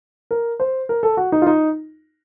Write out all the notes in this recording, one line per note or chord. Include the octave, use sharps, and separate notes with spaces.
A#4
C5
A#4
A4
F#4
D#4
F4
D#4